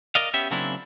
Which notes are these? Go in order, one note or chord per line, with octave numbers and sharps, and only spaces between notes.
A#4 D5 D#5 F5
B3 C#4 G4 E5
C#3 F#3 A#3 C4 D4 E4